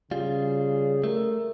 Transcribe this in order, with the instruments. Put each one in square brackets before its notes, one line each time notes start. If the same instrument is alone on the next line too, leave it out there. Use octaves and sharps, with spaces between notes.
[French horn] C#3 [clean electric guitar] G3 F4 [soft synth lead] G#4
[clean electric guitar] A3 [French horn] A#4